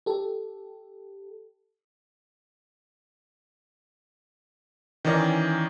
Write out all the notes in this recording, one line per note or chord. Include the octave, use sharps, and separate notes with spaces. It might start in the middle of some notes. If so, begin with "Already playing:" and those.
G4 A4
D#3 E3 C#4 D5 D#5